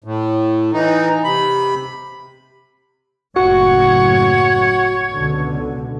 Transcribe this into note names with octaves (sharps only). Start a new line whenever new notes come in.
A2
E3 D#4
C3 B5
F#1 A2 F#4 C#5 F#5
C#2 B2 D3